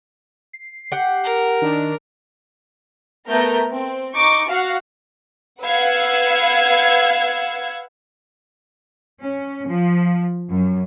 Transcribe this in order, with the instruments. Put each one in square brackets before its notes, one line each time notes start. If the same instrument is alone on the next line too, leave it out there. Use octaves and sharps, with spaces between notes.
[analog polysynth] C7
[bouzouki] G4 F#5
[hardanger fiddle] A#4
[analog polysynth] D#3 D4
[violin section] A3 B3 A#4 A#5 G6
C4
D#4 C#6 D6
F#4 F5 F#5
B4 F5 F#5 E6 G#6
[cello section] C#4
F3
F#2